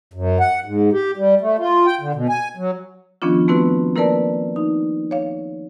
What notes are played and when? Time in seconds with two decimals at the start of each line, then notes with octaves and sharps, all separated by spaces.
0.14 F#2
0.40 F#5
0.65 G#2
0.93 G4
1.17 G3
1.41 A3
1.59 F4
1.86 G5
2.01 D3
2.15 B2
2.29 G#5
2.57 F#3
3.22 D#3 F3 B3 C#4 D4 F4
3.48 A3 B3 C4 E4 F#4 B4
3.96 A#3 E4 A#4 B4 D5 A5
4.56 D#4
5.11 C#5 F5